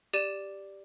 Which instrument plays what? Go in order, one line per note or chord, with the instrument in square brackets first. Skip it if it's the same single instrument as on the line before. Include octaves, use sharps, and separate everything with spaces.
[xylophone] G4 D5 D#7 E7